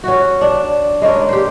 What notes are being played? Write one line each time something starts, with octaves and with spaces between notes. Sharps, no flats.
C#4 F#4
D4
G#3 A#3 C#4 D4
G4 C5